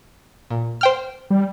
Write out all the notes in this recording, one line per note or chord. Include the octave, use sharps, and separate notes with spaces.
A#2
C5 G5 F6
G3